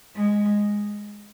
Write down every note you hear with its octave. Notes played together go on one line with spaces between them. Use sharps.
G#3